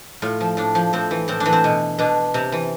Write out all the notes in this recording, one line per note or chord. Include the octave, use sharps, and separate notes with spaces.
A2 F4
F3
A2 D4
F3
A2 C4
E3
A2 C4
D4
E3
C4
B2
B2 D4
C3
E3